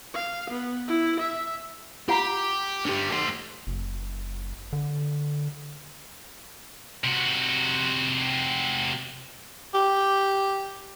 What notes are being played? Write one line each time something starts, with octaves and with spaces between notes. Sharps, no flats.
F5
B3
E4
E5
F4 G4 F#5 A#5
D3 G4
A3 C5
F#1
D3
C3 F#4
G4